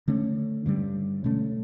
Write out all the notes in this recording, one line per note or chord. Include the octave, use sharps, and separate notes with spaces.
D3 A3 C#4
G2 D3 G3
B2 A3 C#4